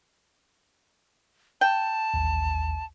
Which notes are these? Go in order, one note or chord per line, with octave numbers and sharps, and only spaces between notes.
G5 A5
A1 D#2